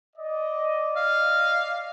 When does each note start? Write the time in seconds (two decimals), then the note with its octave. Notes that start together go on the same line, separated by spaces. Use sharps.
0.16 D5 D#5
0.96 F5